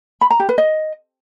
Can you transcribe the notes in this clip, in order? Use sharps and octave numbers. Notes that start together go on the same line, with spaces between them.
B5
A#5
G4
B4
D#5